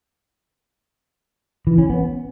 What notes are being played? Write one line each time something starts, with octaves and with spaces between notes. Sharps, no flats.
E3
C#4
B3